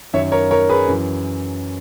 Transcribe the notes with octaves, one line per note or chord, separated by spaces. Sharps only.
F#2 D#3 C#5 E5
A#4 C#5
A#4 C#5
G#4 B4
F#2 E3